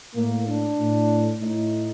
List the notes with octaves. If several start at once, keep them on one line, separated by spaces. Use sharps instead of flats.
A2 A#3
D4
A2
A2 D#4